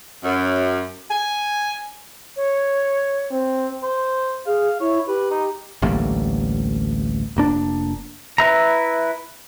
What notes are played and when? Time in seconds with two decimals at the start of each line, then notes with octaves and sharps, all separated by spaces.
0.24 F#2
1.11 G#5
2.36 C#5
3.31 C4
3.83 C5
4.46 G#4 F5
4.80 E4 C#5
5.07 G4 B4
5.31 D#4
5.82 A1 D2 G3 A#3
7.36 F1 A#3 D4
8.38 E4 B4 E5 A#5